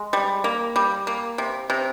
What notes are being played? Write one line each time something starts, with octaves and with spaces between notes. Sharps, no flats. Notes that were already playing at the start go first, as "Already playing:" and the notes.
Already playing: G#3
G3
A#3
G3
A#3
C3
C3